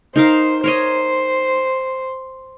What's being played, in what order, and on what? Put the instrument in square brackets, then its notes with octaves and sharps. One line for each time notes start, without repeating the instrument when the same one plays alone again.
[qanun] D#4 A#4 F5 [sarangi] C5
[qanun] A#4 C#5 D#5 [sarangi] C5